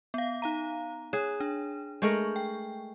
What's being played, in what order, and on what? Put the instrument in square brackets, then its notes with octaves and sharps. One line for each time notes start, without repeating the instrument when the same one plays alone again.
[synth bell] B3 F5
D#4 F5 A#5
[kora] G#4 [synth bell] C#5
[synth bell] D4
[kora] G#3 A3 A#4 [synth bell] C#6 G6
[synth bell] G5